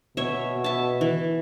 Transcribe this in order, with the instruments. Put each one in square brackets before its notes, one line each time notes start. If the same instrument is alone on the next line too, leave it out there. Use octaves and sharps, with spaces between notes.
[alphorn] B2 [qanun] C#5 E5
[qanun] E5 A5
E3